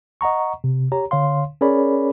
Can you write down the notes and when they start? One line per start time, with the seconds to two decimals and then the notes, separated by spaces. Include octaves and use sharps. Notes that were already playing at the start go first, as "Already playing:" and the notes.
0.21 D#5 F#5 A#5 C#6
0.64 C3
0.92 G4 C#5 A#5
1.11 D3 C#5 F5 C6
1.61 C#4 G#4 A#4 C#5 D5 B5